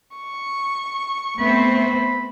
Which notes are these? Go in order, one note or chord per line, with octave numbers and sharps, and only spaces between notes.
C#6
A3 B3 C4 C5 B5